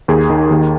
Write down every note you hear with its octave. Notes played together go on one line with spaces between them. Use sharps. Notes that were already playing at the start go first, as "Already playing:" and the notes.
D#2 G#4
D#3
D#2